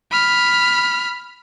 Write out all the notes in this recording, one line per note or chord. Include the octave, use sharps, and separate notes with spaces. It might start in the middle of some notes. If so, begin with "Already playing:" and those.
B5 F6